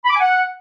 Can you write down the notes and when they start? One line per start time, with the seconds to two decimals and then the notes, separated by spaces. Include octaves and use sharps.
0.05 B5
0.10 D6
0.15 G#5
0.20 F#5